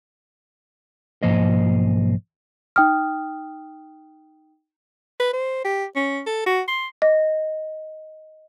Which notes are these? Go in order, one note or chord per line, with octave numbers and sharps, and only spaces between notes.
B1 G#2 F3 A#3 C5 D#5
D#4 G5 D#6 F6
B4
C5
G4
C#4
A4
F#4
C6
D#5